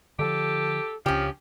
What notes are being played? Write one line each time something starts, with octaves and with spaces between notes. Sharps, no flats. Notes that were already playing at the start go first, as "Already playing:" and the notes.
D3 E3 F3 G4 A4
C#2 C#3 F3 C#4 G4